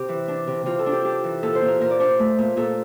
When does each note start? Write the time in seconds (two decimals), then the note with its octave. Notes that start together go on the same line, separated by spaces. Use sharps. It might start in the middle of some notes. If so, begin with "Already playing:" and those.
Already playing: C3 G4
0.09 E3
0.28 D4
0.47 C3
0.66 C3 F4
0.79 A4
0.86 D4
0.92 G4
1.04 D4 G4
1.24 E3
1.43 A#2 A4
1.55 C5
1.61 A#2
1.68 A#4
1.81 A#2 A#4
1.91 D5
2.00 D4 C5
2.19 A3
2.38 A#2
2.57 A#2 A4